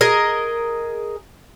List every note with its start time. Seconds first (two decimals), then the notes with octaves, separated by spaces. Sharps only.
0.01 G#4 A#4 D#5